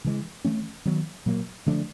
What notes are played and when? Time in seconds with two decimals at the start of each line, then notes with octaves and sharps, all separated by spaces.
0.04 C#3 E3 G#3
0.45 E3 A3 C#4
0.85 D#3 F#3 B3
1.26 A#2 F#3 A#3
1.66 D3 F3 A3 D4